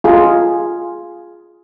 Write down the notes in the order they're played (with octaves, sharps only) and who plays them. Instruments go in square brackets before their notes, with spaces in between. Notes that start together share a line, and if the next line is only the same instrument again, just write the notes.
[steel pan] F4 G#4